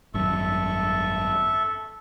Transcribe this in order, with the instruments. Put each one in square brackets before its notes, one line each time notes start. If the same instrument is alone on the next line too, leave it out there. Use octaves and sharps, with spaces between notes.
[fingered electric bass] G#1 F#2 [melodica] A4 E5 C#6